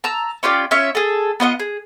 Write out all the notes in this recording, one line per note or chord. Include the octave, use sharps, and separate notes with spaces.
A5 A#5 E6
C#4 F4 G4 D5
C#4 F4 C#5 E5
G#4 A4
B3 F4 D#5 F#5
G#4